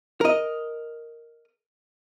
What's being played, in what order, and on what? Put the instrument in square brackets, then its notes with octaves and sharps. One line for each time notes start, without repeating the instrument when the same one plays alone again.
[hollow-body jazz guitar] A#4 D#5